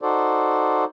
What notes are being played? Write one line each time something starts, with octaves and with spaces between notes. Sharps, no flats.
D#4 F#4 A4 C5 D5